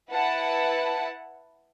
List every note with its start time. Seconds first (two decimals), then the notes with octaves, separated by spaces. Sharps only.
0.11 E4 B4 F#5 A5